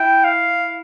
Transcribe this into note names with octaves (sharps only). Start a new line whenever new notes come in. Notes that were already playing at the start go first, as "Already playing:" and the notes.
Already playing: E4 G5
F5